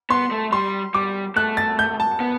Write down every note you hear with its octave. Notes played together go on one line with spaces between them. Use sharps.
B3 C6
A3
G3 C6
G3 D6
A3 F#6
A6
G6
A5
B3